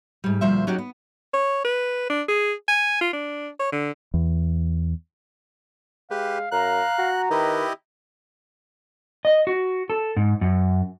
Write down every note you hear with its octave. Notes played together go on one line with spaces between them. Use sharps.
G#2 G3
D2 A#2 F3 C5 E5
F#3 C#4 D#4 F#4 G4
B3
C#5
B4
D4
G#4
G#5
F4
D4
C#5
D3
E2
G#3 G4 B4 F5
F#2 F5 A#5 F#6
F#4
D#3 E4 G4 B4 D#5
D#5
F#4
A4
G#2
F#2